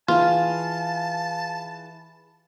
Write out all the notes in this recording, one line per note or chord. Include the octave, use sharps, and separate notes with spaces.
E3 F4 G#4 F5 A5